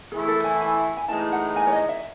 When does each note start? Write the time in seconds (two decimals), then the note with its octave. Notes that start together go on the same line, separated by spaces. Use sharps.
0.12 E3 A3 E4 G#4
0.28 A4
0.44 G#5
0.61 G#5
0.97 G#5
1.08 A2 E3 G#3 D#4 A5
1.32 F#5
1.56 G#5
1.67 C#5
1.73 D#5
1.89 E5